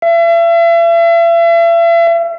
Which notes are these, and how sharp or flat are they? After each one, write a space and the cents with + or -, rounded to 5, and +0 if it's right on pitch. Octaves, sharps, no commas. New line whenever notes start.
E5 +40